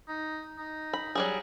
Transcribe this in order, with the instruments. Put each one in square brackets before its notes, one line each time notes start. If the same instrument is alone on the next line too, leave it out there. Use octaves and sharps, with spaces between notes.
[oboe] D#4
D#4
[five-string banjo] B5
F#3 G3 G#4